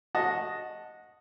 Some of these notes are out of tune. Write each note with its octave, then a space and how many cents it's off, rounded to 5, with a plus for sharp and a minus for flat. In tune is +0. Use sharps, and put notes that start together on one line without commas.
F#4 -15 D#5 +0 A5 +0